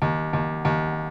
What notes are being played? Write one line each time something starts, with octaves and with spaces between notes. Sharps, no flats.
D#2
D#2
D#2